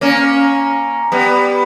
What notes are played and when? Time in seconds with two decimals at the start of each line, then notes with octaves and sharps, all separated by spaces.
0.01 A#3 C#4
1.12 G3 B3